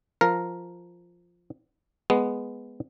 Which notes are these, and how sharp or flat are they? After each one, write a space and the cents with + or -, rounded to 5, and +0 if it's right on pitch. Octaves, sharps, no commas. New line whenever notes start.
F3 +0 A#4 +0
G#3 +0 B3 +0